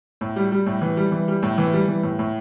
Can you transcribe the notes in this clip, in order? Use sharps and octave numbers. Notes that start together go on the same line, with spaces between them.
A2
G3
G3
A2
E3
G3
E3
G3
A2
E3
G3
E3
A2
A2